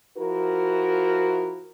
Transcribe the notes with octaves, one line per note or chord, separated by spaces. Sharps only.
F3 E4 F#4 A#4